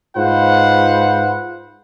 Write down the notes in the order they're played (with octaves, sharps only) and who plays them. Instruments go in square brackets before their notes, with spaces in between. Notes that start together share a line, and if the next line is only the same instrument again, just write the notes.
[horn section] G#2 F4 B4 C5 F#5